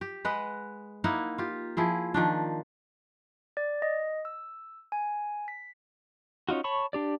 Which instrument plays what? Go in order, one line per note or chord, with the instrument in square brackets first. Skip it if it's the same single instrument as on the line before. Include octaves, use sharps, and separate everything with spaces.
[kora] G4
G#3 B4 D#5 F#5
A#3 D#4 E4 F#5
F4 G4
F3 E4 G#4
D#3 F3 D4
[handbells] D5
D#5
E6
G#5
B6
[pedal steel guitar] C#4 D#4 F4 F#4
C#5 A5 B5 C#6
D4 G4 D5